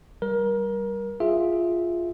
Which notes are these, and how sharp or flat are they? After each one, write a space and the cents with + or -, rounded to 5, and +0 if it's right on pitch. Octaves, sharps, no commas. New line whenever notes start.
G3 -10 A#4 +25
F4 +0 G#4 +0 E5 +0